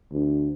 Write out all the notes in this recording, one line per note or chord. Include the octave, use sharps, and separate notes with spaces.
D2